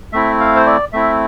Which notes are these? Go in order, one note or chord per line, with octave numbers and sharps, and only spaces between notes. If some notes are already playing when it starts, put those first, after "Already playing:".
A3 C4 E4 E5
F5
C5
D5
A3 C4 E4 E5